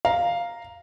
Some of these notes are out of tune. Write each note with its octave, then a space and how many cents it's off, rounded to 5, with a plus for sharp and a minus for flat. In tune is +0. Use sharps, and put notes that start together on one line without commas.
F5 +0 A#5 +0